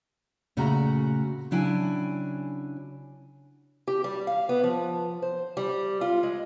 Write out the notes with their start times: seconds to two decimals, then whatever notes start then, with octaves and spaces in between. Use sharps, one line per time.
0.57 A#2 C#3 A3 F#4 F#5 A#5
1.51 C#3 F#3 D4 E4 G5 G#5
3.87 G4
4.04 G3
4.27 F5
4.49 B3
4.64 F3
5.22 C5
5.57 G3
6.01 F4
6.23 G#3